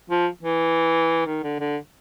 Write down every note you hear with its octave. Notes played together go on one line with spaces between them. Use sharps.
F3
E3
D#3
D3
D3